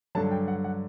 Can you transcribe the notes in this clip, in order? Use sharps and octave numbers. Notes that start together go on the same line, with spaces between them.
G2 D3 F#3 A5
G5
F#5
F#5